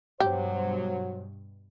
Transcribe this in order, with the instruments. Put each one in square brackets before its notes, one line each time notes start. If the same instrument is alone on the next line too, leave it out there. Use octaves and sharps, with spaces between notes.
[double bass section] G2 B2 [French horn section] F#3 C5 [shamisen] G4